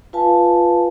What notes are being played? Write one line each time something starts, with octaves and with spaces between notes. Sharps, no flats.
F4 B4 F5 G#5 A5